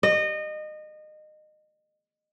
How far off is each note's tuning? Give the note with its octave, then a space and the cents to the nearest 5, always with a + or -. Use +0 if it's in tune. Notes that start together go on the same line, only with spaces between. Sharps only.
D#5 -25